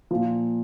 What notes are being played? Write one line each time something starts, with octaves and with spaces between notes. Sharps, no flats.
A#2 F3